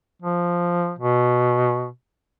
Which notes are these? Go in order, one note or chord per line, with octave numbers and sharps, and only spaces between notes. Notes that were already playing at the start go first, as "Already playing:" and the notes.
F3
B2